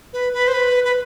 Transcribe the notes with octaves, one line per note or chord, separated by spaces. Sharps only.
B4
B4
C5
B4
B4